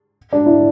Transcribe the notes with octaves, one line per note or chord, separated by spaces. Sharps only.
D4
E4